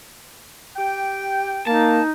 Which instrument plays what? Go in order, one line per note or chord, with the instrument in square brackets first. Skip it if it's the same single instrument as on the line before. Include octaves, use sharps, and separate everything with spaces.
[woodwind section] G4 G5
[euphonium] A#3 [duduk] D#4 [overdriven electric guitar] A5